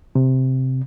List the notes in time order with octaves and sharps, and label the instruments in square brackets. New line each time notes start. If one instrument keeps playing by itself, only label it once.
[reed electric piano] C3